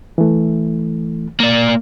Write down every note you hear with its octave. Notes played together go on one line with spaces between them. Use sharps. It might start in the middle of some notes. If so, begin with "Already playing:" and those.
E3 A3
A#3 D5